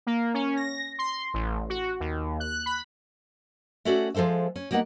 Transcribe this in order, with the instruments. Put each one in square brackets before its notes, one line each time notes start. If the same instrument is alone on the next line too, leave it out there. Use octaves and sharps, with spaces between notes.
[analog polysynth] A#3
C#4
A#6
C6
A1
F#4
D#2
F#6
B5
[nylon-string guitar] A3 C#4 F#4 A4 D5 E5
F3 G#3 A4 C5 E5
C#4
G3 A#3 B3 D#4 F#5